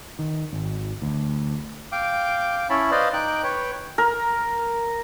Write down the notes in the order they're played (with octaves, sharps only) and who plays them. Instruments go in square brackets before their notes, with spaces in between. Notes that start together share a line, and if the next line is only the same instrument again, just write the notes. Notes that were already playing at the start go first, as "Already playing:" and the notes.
[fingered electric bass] D#3
G#1
D2
[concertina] F5 G5 D6
C#4 E4 C#5 A5 B5
B4 C5 D5 D#5 F5
D#4 G5 D6 F#6
B4 C#5 G5
[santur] A#4